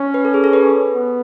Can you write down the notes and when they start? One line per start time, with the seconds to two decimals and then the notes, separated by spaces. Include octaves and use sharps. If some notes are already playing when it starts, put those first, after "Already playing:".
Already playing: C#4
0.14 B4
0.25 A4
0.34 G#4
0.44 A4
0.53 B4
0.93 B3